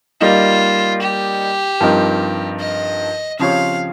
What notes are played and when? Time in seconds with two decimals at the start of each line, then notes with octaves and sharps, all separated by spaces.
0.21 G3 A#3 D#4 F4
1.01 G4
1.80 G2 F3 C4 D#4 A#4
2.60 D#5
3.39 C#3 F3 C4 G4 C#5 F5